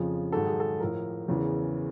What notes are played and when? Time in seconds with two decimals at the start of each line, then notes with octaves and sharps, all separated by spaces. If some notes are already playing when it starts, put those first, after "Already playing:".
Already playing: F2 C#3 F3 G#4
0.32 G#2 D#3 F#3 A4
0.46 G#4
0.60 A4
0.80 A2 F3 A#4
1.28 E2 C#3 E3